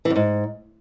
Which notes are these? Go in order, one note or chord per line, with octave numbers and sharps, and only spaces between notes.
E3
F#2
G#2